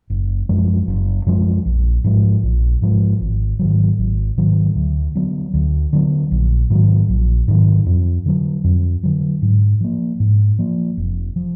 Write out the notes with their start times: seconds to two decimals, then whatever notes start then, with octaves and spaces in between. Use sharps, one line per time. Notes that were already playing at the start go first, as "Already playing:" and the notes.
0.10 F#1
0.49 F#2 F3 G#3
0.88 F#1
1.26 F#2 F3 G#3
1.65 A#1
2.04 G#2 F3 G#3
2.43 A#1
2.82 G#2 F3 G#3
3.21 G#1
3.59 G#2 D#3 F#3
3.98 G#1
4.37 G#2 D#3 F#3
4.76 D2
5.15 D3 F#3 B3
5.54 D2
5.93 D3 F#3 B3
6.31 A#1
6.70 G#2 D#3 F#3
7.09 A#1
7.48 G#2 D#3 F#3
7.86 F2
8.26 D3 F#3
8.64 F2
9.03 D3 F#3
9.42 G#2
9.81 F3 A#3
10.20 G#2
10.59 F3 A#3
10.98 F1
11.36 F3